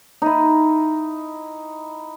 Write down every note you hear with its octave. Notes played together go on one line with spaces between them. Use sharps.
D#4 E4